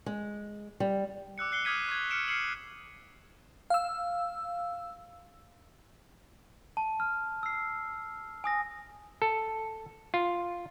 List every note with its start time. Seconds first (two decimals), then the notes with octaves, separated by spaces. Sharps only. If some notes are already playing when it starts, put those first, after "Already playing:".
0.06 G#3
0.80 G3
1.38 D6 E6 F#6 C#7
1.52 D6 F#6 C7 C#7 G7
1.65 D6 D#6 F6 G#6 B6 D#7
1.89 C#6 G#6
2.11 F6 C#7 D7 E7
2.28 F6 C7 C#7 F#7
3.70 F5 E6
6.77 A5
7.00 F6
7.43 E6 C7
8.44 G#5 D#6 A#6
9.22 A4
10.14 F4